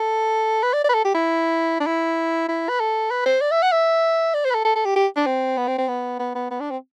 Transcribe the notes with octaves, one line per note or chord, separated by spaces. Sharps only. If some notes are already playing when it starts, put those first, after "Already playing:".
Already playing: A4
B4
D5
D5
B4
A4
G4
E4
D4
E4
E4
B4
A4
B4
C5
D5
E5
F#5
E5
D5
C5
B4
A4
A4
A4
G4
G4
D4
C4
B3
C4
C4
B3
B3
B3
B3
D4
C4